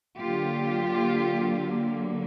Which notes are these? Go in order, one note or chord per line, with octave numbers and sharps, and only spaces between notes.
D3 F#3 A#3 F4 G4